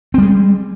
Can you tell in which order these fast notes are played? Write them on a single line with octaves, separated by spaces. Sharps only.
C4 G3 G#3